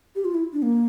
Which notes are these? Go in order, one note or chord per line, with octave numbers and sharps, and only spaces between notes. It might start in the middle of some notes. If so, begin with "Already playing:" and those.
G4
F4
E4
D4
A#3